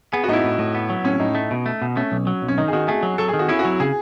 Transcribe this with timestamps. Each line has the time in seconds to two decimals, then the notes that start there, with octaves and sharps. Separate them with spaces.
0.13 B3 G#4
0.24 F#4
0.29 A2 D#4
0.33 E4
0.44 A2
0.59 A2
0.75 B3
0.90 F#3
1.04 A2 C#4
1.20 A2 D#4
1.35 A3
1.51 B2
1.66 A3
1.82 B2
1.96 A3 C#4
2.12 B1
2.27 F#3
2.42 B1
2.48 C#4
2.58 D#3 D#4
2.68 G#4
2.73 D#3 F#4
2.88 A3 G#4
3.03 F#3
3.18 F#3 A4
3.28 G#4
3.34 D#3
3.39 F#4
3.49 C#4 E4
3.59 F#4
3.65 F#3
3.80 C#3 G#4